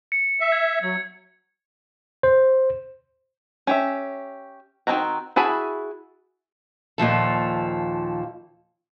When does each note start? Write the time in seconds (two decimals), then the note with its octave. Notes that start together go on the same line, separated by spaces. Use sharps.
0.12 C#7
0.40 E5
0.52 G#6
0.83 F#3 G#6
2.23 C5
3.67 C#4 G4 E5
4.87 D#3 F3 C4 F#4 A#5
5.36 E4 F#4 G#4 A5 B5
6.98 D#2 A#2 F3 A4